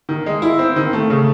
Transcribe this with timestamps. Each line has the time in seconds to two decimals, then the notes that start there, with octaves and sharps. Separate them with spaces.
0.09 D#3
0.26 G#3
0.42 E4
0.59 C4
0.76 D#3
0.93 A3
1.10 C#3